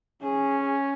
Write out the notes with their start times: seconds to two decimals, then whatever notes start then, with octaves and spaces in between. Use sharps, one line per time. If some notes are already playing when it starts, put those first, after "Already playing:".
0.22 C#4 G#4